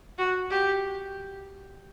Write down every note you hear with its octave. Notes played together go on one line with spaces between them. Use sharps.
F#4
G4